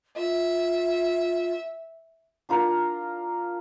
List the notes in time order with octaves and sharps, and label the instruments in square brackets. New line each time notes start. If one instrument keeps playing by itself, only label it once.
[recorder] F4 [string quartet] E5
[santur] D4 F4 A#4